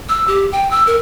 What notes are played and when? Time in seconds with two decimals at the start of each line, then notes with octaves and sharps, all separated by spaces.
0.09 E6
0.28 G4
0.52 G5
0.71 E6
0.87 A#4